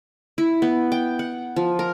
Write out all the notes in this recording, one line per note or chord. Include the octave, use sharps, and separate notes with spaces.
E4
B3
G5
F#5
F3
A#4